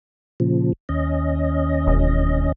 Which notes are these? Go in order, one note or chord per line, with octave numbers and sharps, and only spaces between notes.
A#2 C#3 F3
D#2 C#4 D#5
E1